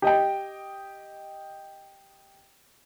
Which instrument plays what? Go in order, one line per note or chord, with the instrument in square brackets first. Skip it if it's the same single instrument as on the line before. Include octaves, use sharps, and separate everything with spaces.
[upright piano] G4 D#5 G5